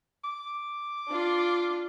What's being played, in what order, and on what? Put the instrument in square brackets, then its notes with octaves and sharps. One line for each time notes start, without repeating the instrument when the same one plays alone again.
[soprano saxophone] D6
[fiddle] D4 F4